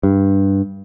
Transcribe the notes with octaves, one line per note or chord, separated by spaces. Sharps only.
G2